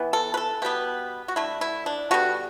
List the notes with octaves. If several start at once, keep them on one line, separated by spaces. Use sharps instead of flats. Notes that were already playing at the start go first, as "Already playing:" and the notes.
Already playing: E3 B3
A4
B4
A4
B2 G3 B3 G4
F#4
D3 A3 E4
E4
D4
D3 G3 B3 F#4